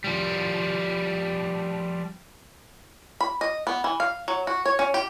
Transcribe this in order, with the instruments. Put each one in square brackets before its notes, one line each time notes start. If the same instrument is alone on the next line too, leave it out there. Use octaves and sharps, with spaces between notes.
[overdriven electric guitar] F3 G3
[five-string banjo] B5
D#5
B3
E3
F5
F#3
F#4
C#5
C#4
G4